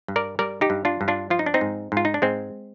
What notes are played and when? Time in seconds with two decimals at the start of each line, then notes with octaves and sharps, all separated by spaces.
0.08 G2
0.16 A#4 D5
0.39 G3 A#4 D5
0.61 D#4 G4
0.70 G2
0.85 D4 F4
1.01 G2
1.08 D4 F4
1.30 F3 F4
1.39 D#4
1.46 D4
1.54 C4 D#4
1.61 G#2
1.92 G#2
1.97 F4
2.05 D#4
2.14 D4
2.22 G#2 G#3 C4